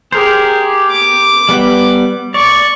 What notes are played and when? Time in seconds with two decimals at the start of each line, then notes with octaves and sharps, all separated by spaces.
0.12 G4 G#4 A#4 C5
0.90 D6
1.49 G3 B3
2.34 D5 C#6